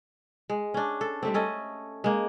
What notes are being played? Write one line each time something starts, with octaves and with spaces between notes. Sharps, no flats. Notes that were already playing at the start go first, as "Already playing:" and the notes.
G#3
C#4 D4
A4
G3 A3 C4
C#4 A4 D#5
G#3 A#3